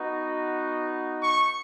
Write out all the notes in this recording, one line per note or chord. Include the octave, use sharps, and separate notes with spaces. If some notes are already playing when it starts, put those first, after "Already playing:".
Already playing: B3 D#4 F#4
C#6